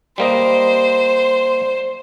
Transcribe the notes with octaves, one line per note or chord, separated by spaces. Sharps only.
G3 A#3 C5 D#5